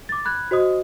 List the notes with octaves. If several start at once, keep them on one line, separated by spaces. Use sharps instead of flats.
D6 A6
B5 F#6 G#6
F#4 C5 D#5 D#6